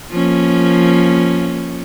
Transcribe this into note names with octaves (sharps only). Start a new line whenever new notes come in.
F3 A#3 C#4